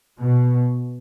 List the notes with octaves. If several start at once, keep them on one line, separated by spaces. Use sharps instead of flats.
B2